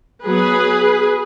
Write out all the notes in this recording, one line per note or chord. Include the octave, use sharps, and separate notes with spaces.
F#3 B3 G#4 B4